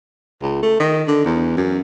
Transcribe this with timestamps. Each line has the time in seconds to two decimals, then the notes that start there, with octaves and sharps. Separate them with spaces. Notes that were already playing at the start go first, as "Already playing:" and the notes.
0.42 C#2
0.62 A3
0.80 D#3
1.07 D3
1.25 E2
1.57 F#2